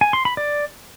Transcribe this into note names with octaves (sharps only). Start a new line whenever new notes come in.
G#5
C6
B5
D5